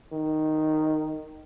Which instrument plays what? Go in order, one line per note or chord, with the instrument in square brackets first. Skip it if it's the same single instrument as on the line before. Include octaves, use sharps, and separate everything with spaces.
[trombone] D#3